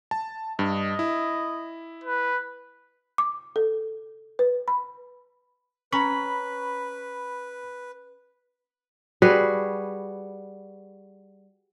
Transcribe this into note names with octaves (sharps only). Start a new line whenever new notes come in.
A5
G2 D#5
E4
B4
D6
A4
B4
B5
C#4 B4 A#5 B5 C#6
G3 F#4 G#4 B4